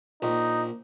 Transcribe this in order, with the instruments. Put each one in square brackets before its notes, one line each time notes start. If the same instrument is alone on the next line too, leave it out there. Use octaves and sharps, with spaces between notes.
[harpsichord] A#1 [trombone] D#4